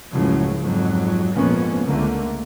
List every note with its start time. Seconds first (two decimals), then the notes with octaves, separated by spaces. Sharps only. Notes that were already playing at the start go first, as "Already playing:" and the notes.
0.11 F#1 C#2 A2 C#3 F3 F#3
0.61 F2 G#2 F#3
1.34 A#1 F2 G#2 A#3 B3 C#4
1.85 C#2 D3 A3 A#3